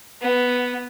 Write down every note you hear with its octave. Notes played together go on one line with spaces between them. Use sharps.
B3